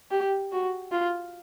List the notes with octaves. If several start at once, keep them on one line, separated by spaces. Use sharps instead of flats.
G4
F#4
F4